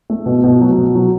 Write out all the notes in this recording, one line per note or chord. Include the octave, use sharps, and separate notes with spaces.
A3
B2
B2
F#3
B2
F#3